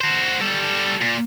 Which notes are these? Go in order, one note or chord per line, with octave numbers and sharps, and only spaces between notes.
F#4 C5
G3 A4
A#2